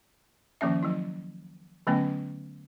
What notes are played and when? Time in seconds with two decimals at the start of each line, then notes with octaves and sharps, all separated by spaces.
0.61 D#3 F3 A#3 C#4 E5
0.83 F#3 E4
1.87 D3 F#3 A3 B3 C#4